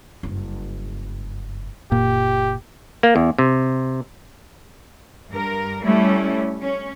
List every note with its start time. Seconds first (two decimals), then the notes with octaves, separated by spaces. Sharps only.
0.23 F#1 G2
1.92 F#1 A#2 G4
3.03 A#3
3.16 E2
3.39 C3
5.31 G2 A#4
5.82 G3 A3 C#4 E4
6.63 C#4